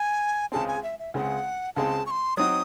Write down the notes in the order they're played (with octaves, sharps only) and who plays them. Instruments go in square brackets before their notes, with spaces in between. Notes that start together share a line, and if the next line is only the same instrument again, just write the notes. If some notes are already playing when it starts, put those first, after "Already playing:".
Already playing: [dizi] G#5
[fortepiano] C#2 C#3 G#3 C4 [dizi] A5
[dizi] G#5
E5
E5
[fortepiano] C#2 C#3 G#3 C4 [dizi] F#5
[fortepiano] C#2 C#3 G#3 C4 [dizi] A5
[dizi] C#6
C6
[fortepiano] F#3 C4 D#4 F#4 [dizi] D#6